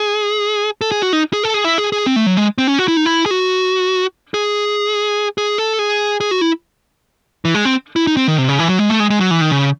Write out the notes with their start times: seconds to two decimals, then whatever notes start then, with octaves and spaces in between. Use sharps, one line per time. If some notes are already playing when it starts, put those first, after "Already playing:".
Already playing: G#4
0.81 A4
0.92 G#4
1.02 F#4
1.13 D#4
1.33 G#4
1.43 A4
1.54 G#4
1.64 E4
1.78 G#4
1.92 G#4
2.06 C4
2.16 A3
2.26 F#3
2.37 G#3
2.58 C4
2.68 C#4
2.78 F#4
2.88 E4
2.97 D#4
3.05 E4
3.26 G#4
3.31 F#4
4.34 G#4
5.38 G#4
5.58 A4
5.79 G#4
6.20 G#4
6.31 F#4
6.41 E4
7.45 E3
7.55 G#3
7.65 C4
7.96 E4
8.07 D#4
8.17 C4
8.28 D#3
8.38 C3
8.49 C#3
8.59 E3
8.68 F#3
8.79 G#3
8.90 A3
9.00 G#3
9.10 G#3
9.20 F#3
9.31 E3
9.41 D#3
9.52 C#3